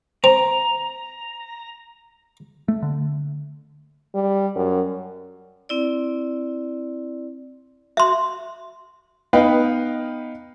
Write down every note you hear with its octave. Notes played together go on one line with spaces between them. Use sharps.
C4 A#5
A3
D3
G3
F#2
C4 E4 D5
F#4 E5 C6
B3 D#4 B4 D#5 F5 G5